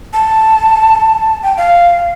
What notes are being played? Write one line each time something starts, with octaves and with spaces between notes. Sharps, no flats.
A5
G5
F5